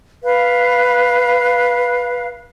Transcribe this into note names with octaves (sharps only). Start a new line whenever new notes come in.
B4 F5